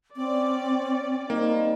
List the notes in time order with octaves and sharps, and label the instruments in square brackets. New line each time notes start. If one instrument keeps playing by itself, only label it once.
[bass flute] C4 [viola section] C#4 D5
[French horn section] G3 C4 D#4 [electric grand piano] A#3